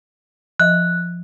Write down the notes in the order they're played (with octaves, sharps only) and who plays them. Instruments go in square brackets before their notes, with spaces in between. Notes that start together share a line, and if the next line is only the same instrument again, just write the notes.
[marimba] F3 D#5 E5 [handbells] F#6